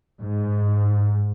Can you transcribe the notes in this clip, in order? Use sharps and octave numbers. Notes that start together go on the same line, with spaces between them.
G#2